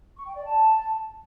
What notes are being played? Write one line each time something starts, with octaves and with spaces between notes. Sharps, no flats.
C#6
G5
D5
A5